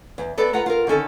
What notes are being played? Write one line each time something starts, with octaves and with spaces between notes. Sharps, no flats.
E2
B3 A4 B4 D5
F4 B4 F#5 A#5
F4 A#4
D3 D#3 C#4 A4